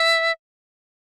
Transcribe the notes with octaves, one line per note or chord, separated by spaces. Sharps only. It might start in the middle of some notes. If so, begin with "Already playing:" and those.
Already playing: E5